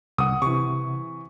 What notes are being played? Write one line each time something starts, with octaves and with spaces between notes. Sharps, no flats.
C2 F#5 D#6
C3 E3 C#6